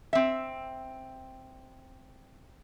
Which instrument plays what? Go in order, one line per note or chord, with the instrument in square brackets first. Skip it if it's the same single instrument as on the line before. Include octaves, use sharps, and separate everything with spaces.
[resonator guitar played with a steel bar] C4 E5